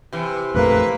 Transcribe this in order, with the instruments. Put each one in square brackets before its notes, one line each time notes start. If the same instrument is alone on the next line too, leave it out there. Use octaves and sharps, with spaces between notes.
[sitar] C3 E3
[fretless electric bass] A#1 F2 A3 [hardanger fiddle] A#3 [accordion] B4